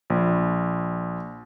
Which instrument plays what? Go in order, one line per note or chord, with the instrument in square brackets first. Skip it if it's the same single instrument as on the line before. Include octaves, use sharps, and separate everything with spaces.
[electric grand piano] A#1